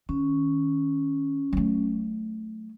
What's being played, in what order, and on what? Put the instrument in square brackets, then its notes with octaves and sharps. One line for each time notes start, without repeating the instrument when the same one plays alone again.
[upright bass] D#3 [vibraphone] C#4
[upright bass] F#3 A3